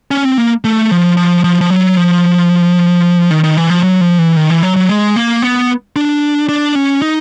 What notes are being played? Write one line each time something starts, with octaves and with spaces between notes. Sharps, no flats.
C#4
C4
A#3
A3
F3
F3
F3
F3
F#3
F3
D#3
D#3
E3
F3
F#3
F3
E3
D#3
E3
F#3
F#3
G#3
A#3
B3
D4
D4
C#4
D#4